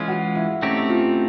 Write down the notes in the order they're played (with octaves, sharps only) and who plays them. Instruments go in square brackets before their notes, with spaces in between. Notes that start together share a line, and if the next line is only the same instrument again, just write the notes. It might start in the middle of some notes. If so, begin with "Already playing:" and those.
Already playing: [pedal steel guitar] E3 G#3 C#4 F4
[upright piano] F#4
E4
[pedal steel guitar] A3 C4 D#4 G4 [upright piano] C#4
[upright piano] F4